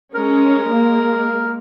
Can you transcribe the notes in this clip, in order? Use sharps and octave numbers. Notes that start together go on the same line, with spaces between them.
G#3 C#4 A#4
G#3 A#3